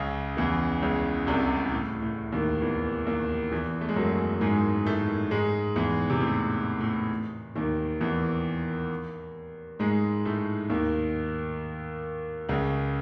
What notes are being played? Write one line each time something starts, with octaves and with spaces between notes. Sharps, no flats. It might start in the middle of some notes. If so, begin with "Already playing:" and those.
Already playing: C#2 C#3
E2 E3
C#2 C#3
C2 C3
A2
A2
D#2 D#3
E2 E3
D#2 D#3
E2 E3
A3
G#3
F#2 F#3
G#2 G#3
A2 A3
G#2 G#3
E2 E3
C3
A2
A2
D#2 D#3
E2 E3
G#2 G#3
A2 A3
D#2 D#3
C#2 C#3